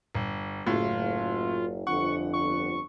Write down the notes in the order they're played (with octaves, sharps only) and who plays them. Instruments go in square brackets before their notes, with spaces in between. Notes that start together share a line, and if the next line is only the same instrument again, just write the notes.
[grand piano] G1
[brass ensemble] F#1 [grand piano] A2 [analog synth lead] F4
[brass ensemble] G1 F2 [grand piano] F#5 [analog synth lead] C#6
[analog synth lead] C#6